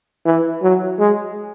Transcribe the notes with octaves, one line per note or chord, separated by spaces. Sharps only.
E3
F#3
G#3